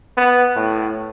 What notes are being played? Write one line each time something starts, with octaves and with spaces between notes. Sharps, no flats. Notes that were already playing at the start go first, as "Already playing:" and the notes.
B3
A2